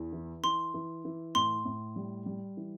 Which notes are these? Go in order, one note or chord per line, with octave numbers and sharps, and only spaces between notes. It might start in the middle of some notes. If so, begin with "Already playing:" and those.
Already playing: E2
E3
E3 C6
E3
E3
A2 C6
A2
G3
G3
E3